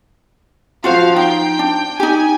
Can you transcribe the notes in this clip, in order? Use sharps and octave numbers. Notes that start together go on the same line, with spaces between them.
F3 F4 F#4 C5 F5
D#4 G5
D4
D#4 G4 G#5